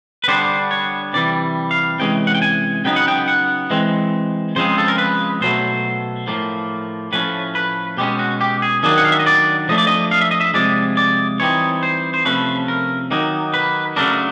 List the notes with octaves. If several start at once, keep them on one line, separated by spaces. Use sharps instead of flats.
B4
D3 G3 B3 D4 C5
C#5
C3 E3 G3 D5
F5
C3 E3 G#3 C#4 G5
F#5
G5
G#5
C#3 F#3 B3 D#4 G5
F#5
G5
F#5
E3 G#3 C4
C#3 F3 G#3 C4 C5
A4
A#4
B4
B2 F#3 A3 C5
A2 F3 A#3
A2 F3 A3 C#4 B4
B4
B2 G#3 C#4 G4
F#4
G4
G#4
D#3 F#3 A#3 D4 G#4
F#5
F5
E5
D#5
D5
F3 A3 D4 D#5
D5
D#5
F5
E5
D#5
E5
C3 F3 G#3 D5
D5
E3 G3 C4 D#4 C#5
C5
C5
C3 F3 A3 C#4 B4
A#4
D#3 F#3 A#3 D#4
B4
C#3 F#3 A3 D4 A#4